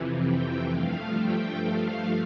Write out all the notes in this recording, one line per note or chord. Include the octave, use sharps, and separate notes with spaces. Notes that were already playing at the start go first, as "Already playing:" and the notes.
Already playing: F2 C3 E3
G5
G2 F3 A3 F5
G5
F5